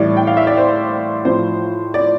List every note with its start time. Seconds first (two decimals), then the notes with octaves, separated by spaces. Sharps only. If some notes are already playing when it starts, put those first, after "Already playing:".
Already playing: A2 E3 G3 D5
0.17 G5
0.27 F5
0.37 E5
0.47 D5
0.57 C5
1.25 A2 F3 C5
1.94 D5